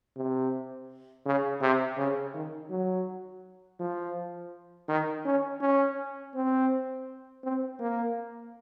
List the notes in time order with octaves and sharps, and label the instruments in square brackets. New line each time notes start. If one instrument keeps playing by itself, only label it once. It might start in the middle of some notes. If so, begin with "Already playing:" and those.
[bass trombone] C3
C#3
C3
C#3
D#3
F#3
F3
D#3
C#4
C#4
C4
C4
A#3